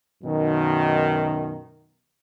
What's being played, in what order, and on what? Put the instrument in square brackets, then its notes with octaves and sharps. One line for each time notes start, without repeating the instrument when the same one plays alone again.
[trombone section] F#2 B2 D#3